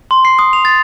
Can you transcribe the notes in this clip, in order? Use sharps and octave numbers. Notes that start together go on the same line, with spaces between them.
C6
C7
D#6
F7
A6